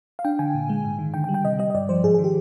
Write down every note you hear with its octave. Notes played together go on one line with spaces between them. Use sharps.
F5
D4 G5
D3 G#5
A#2
G#3
G#2
D#3
D3 G5
G5
G3
G5
C3 D#5
G3 D#5
D#5
G2 D5
F3 C5
G#2 G#4
G#4
D#3
G4